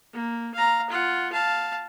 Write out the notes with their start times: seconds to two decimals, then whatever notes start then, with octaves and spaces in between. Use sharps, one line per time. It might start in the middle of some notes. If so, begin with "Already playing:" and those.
0.13 A#3
0.54 F5 A#5
0.90 F4 F#5
1.32 F5 A5